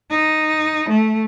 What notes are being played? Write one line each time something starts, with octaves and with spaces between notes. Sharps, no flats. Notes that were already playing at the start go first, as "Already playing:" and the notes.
D#4
A3